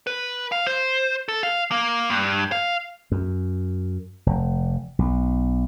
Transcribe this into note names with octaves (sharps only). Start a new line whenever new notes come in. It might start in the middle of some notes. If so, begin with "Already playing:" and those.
B4
F5
C5
A4
F5
A#3
G2
F5
F#2
F1
B1